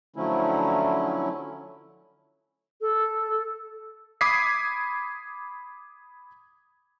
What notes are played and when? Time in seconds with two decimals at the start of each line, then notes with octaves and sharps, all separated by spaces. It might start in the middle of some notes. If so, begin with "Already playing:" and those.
0.16 D3 F3 F#3 A3 C#4 E4
2.81 A4
4.21 B5 D6 D#6 G#6 B6 C7